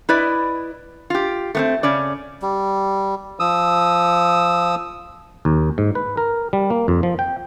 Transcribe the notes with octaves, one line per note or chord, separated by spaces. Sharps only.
E4 B4 D5 D#5
F4 G4
A3 B3 C4
C#3 C#4 D5
G3
F3 D#6 E6
D#2
G#2
B4
A#4
G3
A#3
F2
F3
G5